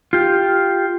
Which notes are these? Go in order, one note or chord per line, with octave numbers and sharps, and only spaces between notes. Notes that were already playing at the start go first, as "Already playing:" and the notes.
F4 G4